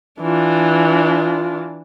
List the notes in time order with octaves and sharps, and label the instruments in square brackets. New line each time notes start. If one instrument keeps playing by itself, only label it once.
[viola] E3 D4 [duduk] F4